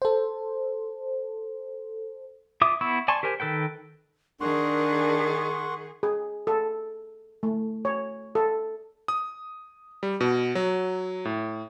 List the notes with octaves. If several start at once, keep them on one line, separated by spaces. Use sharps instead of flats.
A4 C5
F4 E5 D6 D#6
B3 E4 C#6 E6
D5 G#5 A5 C6 C#6
G4 A#4 C5 G#5
D#3 A4 B4 G5
D#3 D4 G#4 A#4 F#5 C6 C#6
G#4
A4
A3
C#5
A4
D#6
G3
B2
F#3
A2